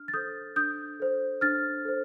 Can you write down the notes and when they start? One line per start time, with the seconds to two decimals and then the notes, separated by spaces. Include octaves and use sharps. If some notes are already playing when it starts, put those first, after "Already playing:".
Already playing: D4 F6
0.08 A6
0.14 A4 C5 D#6 G6
0.56 D4 D#6 G6
1.00 A4 C5
1.41 D4 F6 A6
1.85 A4 C5